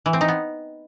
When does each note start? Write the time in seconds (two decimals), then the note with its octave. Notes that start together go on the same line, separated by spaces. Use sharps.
0.06 E3
0.13 C4
0.21 D#4
0.28 B3